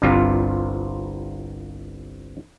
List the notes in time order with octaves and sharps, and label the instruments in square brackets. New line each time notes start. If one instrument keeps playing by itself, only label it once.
[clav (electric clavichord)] G1 C2 G2 C3 F4